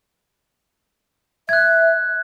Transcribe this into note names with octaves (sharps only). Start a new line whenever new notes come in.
E5 F#6 G#6